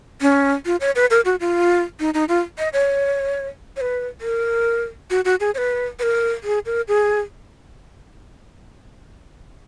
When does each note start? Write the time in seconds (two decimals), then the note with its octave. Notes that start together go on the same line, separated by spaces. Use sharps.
0.21 C#4
0.66 F4
0.81 C#5
0.96 B4
1.11 A#4
1.25 F#4
1.40 F4
2.00 D#4
2.14 D#4
2.29 F4
2.58 D#5
2.73 C#5
3.76 C#5
3.81 B4
4.21 A#4
5.10 F#4
5.25 F#4
5.40 G#4
5.55 C#5
5.58 B4
5.99 B4
6.03 A#4
6.44 G#4
6.66 A#4
6.88 G#4